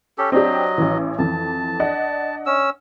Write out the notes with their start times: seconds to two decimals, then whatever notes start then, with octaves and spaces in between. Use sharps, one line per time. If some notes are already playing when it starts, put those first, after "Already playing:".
0.18 C#4 G4 A4
0.32 F#3 C4 D4 G4 D#5
0.78 A1 E3
1.19 F2 E3 A5
1.80 D4 D#5 F#5
2.46 C#4 E6